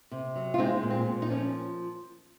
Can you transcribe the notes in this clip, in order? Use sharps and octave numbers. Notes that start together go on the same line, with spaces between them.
C3
F#3
F4
G#3 C4 D#4
A#2
C4
A#2
D#4
F3 C#4